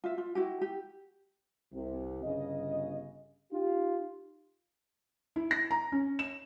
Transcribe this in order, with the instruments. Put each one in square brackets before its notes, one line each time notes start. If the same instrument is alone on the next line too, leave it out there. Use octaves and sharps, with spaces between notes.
[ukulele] F4 E5
F4
E4 F#4 G4
G4
[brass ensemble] C2 C3
G1 C#3 D#5
D#4 F4 G4
[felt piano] E4
A#6
A#5
C#4
E7